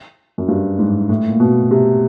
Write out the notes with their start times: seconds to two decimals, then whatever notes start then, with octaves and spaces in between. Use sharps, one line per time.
0.38 F#2
0.48 G2
0.79 G#2
1.09 A2
1.28 A#2
1.40 B2
1.71 C3